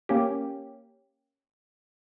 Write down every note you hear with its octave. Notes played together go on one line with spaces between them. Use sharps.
A#3 C#4 G4